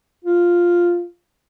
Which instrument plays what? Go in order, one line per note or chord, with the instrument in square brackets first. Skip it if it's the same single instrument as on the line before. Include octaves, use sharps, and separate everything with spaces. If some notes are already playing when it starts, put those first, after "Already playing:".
[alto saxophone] F4